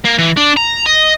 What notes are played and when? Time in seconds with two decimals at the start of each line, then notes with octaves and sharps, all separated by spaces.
0.05 A#3
0.18 E3
0.37 D4
0.57 A#5
0.86 D#5